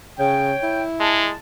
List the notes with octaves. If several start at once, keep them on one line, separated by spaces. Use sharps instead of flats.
C#3 C#5 G5
E4
G#3 A5